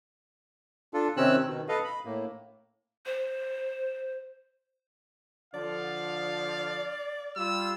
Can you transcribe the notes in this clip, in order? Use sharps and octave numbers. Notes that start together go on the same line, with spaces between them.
D4 F4 A4
C3 D#3 C4 C#4 E6 F#6
B2 D#3
A4 B4 D#5 F5
B5
A2 A#3
C5
D3 F3 D5 F5
G3 F4 E6